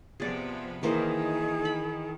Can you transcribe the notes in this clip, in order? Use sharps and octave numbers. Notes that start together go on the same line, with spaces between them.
C3 F3 B3 G#4 D5
D#3 E3 A#3 G#4 C5
B5